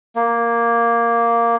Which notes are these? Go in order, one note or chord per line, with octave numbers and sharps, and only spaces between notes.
A#3